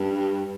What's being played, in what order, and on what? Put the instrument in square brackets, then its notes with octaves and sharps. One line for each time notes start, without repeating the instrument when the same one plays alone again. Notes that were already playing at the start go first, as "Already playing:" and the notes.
Already playing: [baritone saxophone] G2